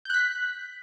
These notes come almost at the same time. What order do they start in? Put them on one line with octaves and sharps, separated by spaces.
G6 F#6 B6